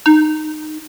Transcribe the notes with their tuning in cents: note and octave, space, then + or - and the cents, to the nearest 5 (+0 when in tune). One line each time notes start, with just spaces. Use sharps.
D#4 -15